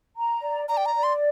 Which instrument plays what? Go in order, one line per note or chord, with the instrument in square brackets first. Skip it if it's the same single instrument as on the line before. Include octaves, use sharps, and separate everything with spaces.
[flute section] A#5
D5
[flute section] D5 [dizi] A#5
[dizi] G5
A#5
[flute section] D5
[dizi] C6